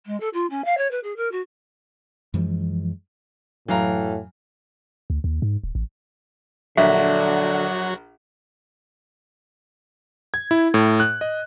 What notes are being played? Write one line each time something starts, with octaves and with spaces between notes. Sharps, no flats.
G#3
A4
F4
C#4
F5
C#5
B4
G#4
A#4
F#4
F#2 E3 F3 G#3
F#2 A2 E3 F#3 F5 A#5
D2
D#2
G#2
D1
A1
A#1 D3 F#3 F#4 E5
G#6
E4
A2
F#6
D#5